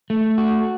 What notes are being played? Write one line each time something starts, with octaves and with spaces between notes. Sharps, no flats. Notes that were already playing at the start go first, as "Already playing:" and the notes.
A3
F#4